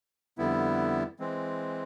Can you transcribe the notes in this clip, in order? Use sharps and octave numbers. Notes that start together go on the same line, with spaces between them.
F2 D3 G3 B3 E4
E3 G#3 C4